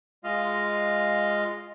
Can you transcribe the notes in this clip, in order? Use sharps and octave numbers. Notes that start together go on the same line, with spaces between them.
G#3 F4 D#5 F5